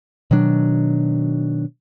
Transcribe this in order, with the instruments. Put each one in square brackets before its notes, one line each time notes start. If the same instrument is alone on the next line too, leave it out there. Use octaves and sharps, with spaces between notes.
[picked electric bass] B2 D#3 F#3 D4